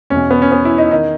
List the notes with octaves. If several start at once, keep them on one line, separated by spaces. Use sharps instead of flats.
E2 C#4
B2
B3
C#4
B3
E4
D#4
D#3 D#4